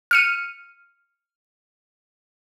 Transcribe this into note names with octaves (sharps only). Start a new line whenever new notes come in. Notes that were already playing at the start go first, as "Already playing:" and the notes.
F6 C#7 D#7